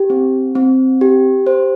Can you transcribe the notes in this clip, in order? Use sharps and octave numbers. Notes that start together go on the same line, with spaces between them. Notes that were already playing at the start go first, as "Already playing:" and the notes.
Already playing: G4
C4
C4
G4
C5